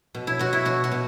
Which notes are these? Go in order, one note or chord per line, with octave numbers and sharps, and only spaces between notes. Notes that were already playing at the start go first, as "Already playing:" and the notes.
B2
E4
B2 F#4
E4
B2 F#4
F#4
B2